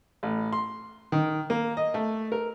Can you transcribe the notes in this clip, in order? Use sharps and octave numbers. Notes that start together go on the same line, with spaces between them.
A1
C6
D#3
A#3
D#5
A3
A#4